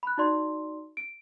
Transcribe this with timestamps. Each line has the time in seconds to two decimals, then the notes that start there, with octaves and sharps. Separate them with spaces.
0.03 B5 F#6
0.18 D#4 F#4 D5 C6
0.97 D7